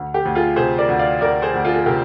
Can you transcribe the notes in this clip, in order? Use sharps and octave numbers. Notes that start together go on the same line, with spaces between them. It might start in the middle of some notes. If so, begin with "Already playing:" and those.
Already playing: D2
G4
D2
F4 G#4
C3 G#4 C5
A#4 D5
D2
D5 F5
D2 A#4 D5
G#4 C5
D2
F4 G#4
G#4
C3 G4 A#4